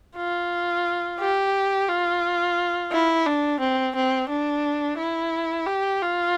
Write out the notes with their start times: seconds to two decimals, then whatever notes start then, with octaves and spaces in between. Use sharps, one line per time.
0.17 F4
1.20 G4
1.89 F4
2.92 E4
3.27 D4
3.60 C4
3.96 C4
4.29 D4
4.98 E4
5.67 G4
6.02 F4